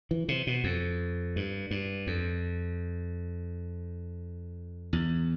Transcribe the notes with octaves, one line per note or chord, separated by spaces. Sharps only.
E3
C3
B2
F2
G2
G2
F2
E2